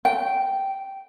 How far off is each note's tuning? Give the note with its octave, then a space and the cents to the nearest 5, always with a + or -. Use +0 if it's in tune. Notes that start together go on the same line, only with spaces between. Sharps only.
G5 -10